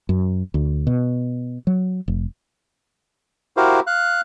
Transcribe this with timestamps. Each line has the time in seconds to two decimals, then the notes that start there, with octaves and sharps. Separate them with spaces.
0.09 F#2
0.54 D2
0.87 B2
1.67 F#3
2.08 F1
3.57 E4 F#4 G4 A#4 C5 F5
3.87 F5 F#6